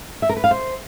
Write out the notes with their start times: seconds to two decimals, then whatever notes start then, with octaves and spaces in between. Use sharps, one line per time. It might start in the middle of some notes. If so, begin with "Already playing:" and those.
0.22 E5
0.29 A#4
0.37 B4
0.44 F5
0.51 C5